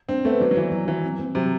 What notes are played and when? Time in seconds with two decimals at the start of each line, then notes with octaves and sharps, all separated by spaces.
0.09 C4 D4
0.25 A3 B3
0.40 F#3 D5
0.51 F#3
0.57 E3 D5
0.72 F#3
0.88 E3 F#3
1.04 C4
1.19 C4
1.35 C3 F#3